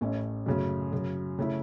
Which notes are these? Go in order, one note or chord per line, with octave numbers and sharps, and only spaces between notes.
A1 A2 A3 C#4
F#2 C#3 A3
F#2 C#3 F#3
C#3 A3 E4